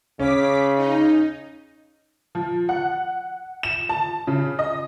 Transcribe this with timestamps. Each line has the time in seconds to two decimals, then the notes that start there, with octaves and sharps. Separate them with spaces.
0.19 C#3 C#4 D6 B6
0.78 D#4
2.35 F3
2.69 F#5
3.63 E7
3.89 A5
4.27 C#3
4.59 D#5